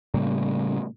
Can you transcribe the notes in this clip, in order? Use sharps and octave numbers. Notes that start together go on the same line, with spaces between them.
A2 C#3 G3 A#3